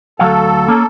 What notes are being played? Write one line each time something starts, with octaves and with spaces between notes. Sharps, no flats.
D2 F#3 A4 F5
A#3 C#4